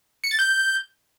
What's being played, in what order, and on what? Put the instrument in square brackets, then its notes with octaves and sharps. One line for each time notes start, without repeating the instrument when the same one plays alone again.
[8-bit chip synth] C#7
A6
G6